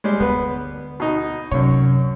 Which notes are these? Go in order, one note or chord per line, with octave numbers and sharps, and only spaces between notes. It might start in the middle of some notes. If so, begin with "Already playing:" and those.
G3 G#3
D2 D3 B3 B4
B2 D#4
F#2 C3 C#5